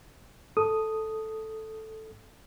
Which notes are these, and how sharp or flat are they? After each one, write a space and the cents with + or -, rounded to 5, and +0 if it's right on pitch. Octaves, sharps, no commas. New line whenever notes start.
A4 +0 D#6 +0